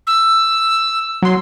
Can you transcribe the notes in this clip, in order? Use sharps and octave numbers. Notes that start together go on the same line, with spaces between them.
E6
F#3 C6